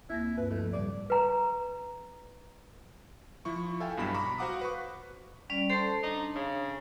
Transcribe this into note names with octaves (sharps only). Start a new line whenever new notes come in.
D2 A#3 E4 A#6
G2 B4
F3 A3
A2 C#3 G3 D5
B4 A#5
F3 E4 C#6
A4 E5 F5 G5 G#5
B1 G2 B2 B5 B6 E7
A#5 B5 C#6 D6
F#4 C5 F5 F#5 D6 D#6
B4 C#6
G3 C#4 D5
A4 C5 A5
D4 D#4
C#3